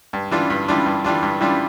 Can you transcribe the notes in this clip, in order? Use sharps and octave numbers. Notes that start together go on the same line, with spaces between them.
G2
E3 G3 D4 F4
G2
E3 G3 D4 F4
G2
E3 G3 D4 F4
G2
E3 G3 D4 F4